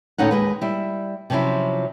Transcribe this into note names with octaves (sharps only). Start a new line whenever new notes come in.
D2 A2 C#4 D#4 F#5
D#2 G#3 B4
G3 E4
C3 F3 F#3 C#4 E4